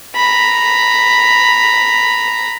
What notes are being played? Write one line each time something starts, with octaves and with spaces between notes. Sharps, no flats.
A#5 B5